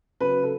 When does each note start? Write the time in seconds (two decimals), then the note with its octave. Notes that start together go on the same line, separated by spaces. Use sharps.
0.21 C#3 F#3 B4
0.43 A4